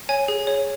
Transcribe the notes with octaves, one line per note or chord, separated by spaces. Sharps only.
C#5 G#5
G#4
C#5